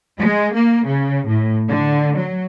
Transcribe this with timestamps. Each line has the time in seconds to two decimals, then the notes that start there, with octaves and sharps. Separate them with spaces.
0.18 G#3
0.53 A#3
0.86 C#3
1.27 A2
1.69 D3
2.17 F#3